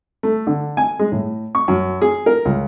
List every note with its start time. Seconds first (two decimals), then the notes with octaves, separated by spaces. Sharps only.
0.23 A3
0.47 D3
0.77 G#5
0.99 G#3
1.12 A2
1.55 C#6
1.68 F#2
2.02 G#4
2.26 A#4
2.45 C#2